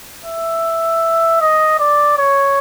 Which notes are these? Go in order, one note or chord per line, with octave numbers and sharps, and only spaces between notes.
E5
D#5
D5
C#5